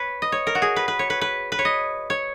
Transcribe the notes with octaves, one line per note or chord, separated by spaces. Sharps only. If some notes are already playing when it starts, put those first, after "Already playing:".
Already playing: B4 C#5
D#5
C#5
A#4
F#4
G#4
B4
B4
C#5
B4
B4
B4
C#5
D#5
C#5